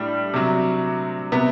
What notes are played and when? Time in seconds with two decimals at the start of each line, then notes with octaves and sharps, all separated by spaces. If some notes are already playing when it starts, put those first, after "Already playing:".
Already playing: A2 G3 D4
0.34 C3 F#3
1.32 C3 B3